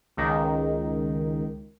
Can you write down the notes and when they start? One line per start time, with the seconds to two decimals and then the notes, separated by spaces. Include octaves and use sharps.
0.17 C#2 D#3